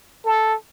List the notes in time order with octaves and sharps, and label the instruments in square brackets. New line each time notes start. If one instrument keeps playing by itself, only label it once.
[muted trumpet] A4